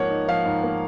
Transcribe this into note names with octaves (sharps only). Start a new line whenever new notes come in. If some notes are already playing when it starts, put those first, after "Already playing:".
Already playing: G#2 F3 A#3 C#5 F#5
D#4
F3 F5
G#2
A#3